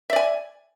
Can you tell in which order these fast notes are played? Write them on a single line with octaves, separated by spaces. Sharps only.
E5 D5 G#5